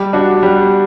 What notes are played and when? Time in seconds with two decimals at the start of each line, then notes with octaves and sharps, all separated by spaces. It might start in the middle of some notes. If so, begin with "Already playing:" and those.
Already playing: G3
0.13 D4 F#4
0.43 G3